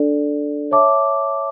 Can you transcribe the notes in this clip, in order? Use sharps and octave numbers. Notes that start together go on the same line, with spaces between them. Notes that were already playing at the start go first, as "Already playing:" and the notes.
Already playing: D4 A4 D5
C#5 E5 A5 D6